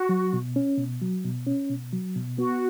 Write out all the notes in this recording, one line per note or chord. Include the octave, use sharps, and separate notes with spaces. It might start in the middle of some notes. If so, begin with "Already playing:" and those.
Already playing: F#4
F#3
B2
C#4
B2
F#3
B2
C#4
B2
F#3
B2
B3 F#4